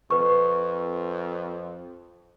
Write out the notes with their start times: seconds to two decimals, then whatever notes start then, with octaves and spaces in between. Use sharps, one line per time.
0.11 F2 B4 C#6